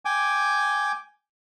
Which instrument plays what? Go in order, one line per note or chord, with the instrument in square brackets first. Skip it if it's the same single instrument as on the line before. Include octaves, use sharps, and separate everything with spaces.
[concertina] G5 G#5 D6